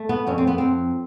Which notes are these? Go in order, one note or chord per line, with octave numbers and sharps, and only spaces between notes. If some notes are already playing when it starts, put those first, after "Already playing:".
Already playing: A3
B3
F2 C#4
C4
B3
F2 C4